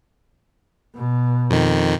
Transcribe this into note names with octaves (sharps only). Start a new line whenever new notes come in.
B2
F2 D#3